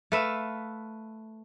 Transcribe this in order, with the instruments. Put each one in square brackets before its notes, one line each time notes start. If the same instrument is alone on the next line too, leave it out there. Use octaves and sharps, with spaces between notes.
[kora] A3 B4 E5 F5